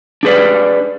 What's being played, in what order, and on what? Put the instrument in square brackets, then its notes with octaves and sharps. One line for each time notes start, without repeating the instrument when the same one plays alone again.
[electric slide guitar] D4 G#4 B4 D5